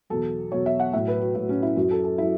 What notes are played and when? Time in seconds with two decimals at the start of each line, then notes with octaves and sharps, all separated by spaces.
0.10 E2 B2 F#3 A4
0.51 E2 B2 F#3 C#5
0.66 E5
0.80 F#5
0.93 A2 F#3 E5
1.08 B4
1.21 F#4
1.35 A2 F#3 F#4
1.49 C#4
1.63 E4
1.76 F#2 F#3 F#4
1.91 A4
2.04 A4
2.18 F#3 E4